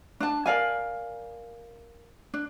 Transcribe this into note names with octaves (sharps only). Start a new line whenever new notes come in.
D4 A5
A#4 D5 F5 G#5
D4